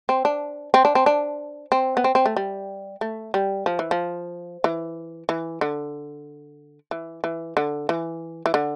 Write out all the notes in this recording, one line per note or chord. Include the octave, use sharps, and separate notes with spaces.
C4
D4
C4
D4
C4
D4
C4
B3
C4
C4
A3
G3
A3
G3
F3
E3
F3
E3
E3
D3
E3
E3
D3
E3
E3
D3